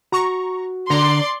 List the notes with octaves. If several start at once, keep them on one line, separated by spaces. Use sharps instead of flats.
F#4 A#5 C#6
D3 D5 A#5 C6